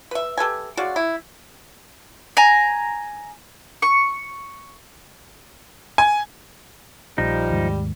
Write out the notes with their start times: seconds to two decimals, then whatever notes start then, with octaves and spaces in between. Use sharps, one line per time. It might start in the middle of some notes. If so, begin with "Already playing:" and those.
0.11 B4 E5
0.38 G4 A4 B4 G#5
0.77 C#3 G#3 F#4 D5
0.96 E4
2.37 G#5 A#5
3.82 C#6
5.98 G#5
7.18 A#1 F3 G3 D#4
7.51 D#2 G#2